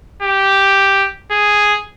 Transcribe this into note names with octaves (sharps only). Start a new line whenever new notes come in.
G4
G#4